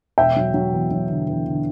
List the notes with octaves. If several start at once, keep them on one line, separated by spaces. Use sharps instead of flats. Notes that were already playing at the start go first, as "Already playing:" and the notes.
E1 E5 G5
F#3
F#3
E2
F#3
D3
E2
D3